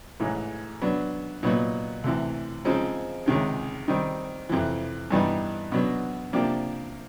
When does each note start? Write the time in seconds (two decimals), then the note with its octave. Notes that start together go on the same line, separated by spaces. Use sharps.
0.20 A1 G#2 E3
0.82 F#3 B3 D4
1.43 A#2 F#3 B3 D#4 F#4
2.04 D2 C3 E3
2.65 C#3 F3 G#3 C4 D#4
3.26 C#2 C3 D#3 G#3
3.88 D#3 G3 C4 D#4
4.49 F2 C3 E3
5.11 G2 E3 G3 B3 D#4
5.72 B2 F#3 B3 D4
6.33 C3 F3 A#3 D4 G4